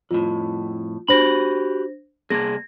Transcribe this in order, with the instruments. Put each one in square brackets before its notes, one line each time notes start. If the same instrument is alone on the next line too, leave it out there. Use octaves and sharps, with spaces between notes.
[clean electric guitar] F2 A2 [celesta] F4
[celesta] D4 C5 A#6 [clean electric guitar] F#4 G4 B5
[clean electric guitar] C2 A#3 G#4 [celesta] G#6 A#6